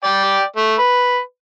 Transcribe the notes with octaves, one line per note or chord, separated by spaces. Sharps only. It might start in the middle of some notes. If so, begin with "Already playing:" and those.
D5 G5
A3
B4